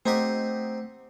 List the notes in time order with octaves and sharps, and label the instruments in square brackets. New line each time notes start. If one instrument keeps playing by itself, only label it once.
[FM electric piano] A3 F#5 [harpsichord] C4 D#4 G4